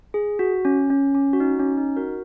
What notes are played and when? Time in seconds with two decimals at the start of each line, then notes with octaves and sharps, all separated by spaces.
0.14 G#4
0.39 F#4
0.65 C#4
0.90 C#4
1.15 C#4
1.33 F#4
1.40 D#4
1.59 C#4
1.77 D#4
1.96 F#4 A#4